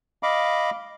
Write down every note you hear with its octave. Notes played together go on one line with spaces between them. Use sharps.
D#5 F5 B5 D6